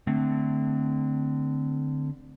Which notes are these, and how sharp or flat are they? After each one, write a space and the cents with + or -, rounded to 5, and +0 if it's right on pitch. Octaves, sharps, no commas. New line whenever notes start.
D3 +10 A3 +0 C4 -20